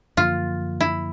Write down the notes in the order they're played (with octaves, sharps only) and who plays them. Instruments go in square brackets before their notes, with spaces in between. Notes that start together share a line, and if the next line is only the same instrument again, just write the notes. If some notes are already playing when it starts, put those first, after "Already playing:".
[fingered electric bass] F#2 D3 F3 A#3 [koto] F4
[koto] E4